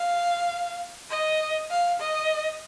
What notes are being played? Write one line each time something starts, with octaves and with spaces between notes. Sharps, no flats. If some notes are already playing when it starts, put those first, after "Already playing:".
Already playing: F5
D#5
F5
D#5